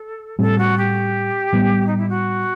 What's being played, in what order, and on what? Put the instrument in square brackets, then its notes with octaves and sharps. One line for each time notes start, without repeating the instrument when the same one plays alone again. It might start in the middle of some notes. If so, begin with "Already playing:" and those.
Already playing: [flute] A4
[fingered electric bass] A2 G3 C4 [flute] A4
[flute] F#4
G4
[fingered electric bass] A2 G3 B3
[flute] D#4
E4
F#4